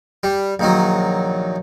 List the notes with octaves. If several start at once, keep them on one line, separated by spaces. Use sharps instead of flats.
G3
A#1 D#3 F#3